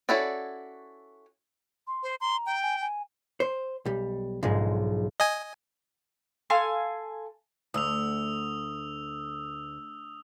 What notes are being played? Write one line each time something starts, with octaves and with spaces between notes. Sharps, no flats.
C#4 E4 F#4 A4 D5
C6
C5
A#5 C6
G5
G#5
G#5
C5
B1 G3
B1 G#2 D3 F3 G#3
D#5 G#5
A4 F5 G#5 C6
D2 D#6 E6 F7